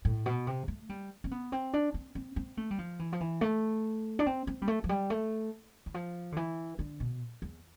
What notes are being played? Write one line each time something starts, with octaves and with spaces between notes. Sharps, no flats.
A2
B2
C3
A3
G3
C4
B3
C4
D4
C4
C4
C4
A3
G3
F3
E3
F3
E3
A3
D4
C4
C4
G3
A3
F3
G3
A3
E3
F3
D3
E3
D3
B2
E2